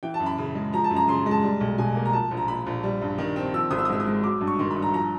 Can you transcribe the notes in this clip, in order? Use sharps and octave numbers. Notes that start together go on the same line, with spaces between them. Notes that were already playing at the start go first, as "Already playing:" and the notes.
E3 G5
A5
F#2
B5
C#3
G#3
F3 A#5
A5
F#2
A#5
C#3 C6
G#3
A5
G3
B1
B2 G#5
A#3
A#5
F3 A5
A#1
A#5
A#2 B5
A#1
G3
G2
D#3
C4
F3 E6
G#1 D#6
E6
D#6
G#2 E6
D#6
G#3
F#3 D6
G2
C#6
D#3 C6
B5
G2
A#5
F3 A#5